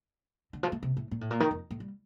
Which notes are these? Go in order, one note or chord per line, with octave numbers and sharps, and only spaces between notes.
D3
F3
A3
C3
A2
A#2
A2
A#2
D#3
F2
A2
G3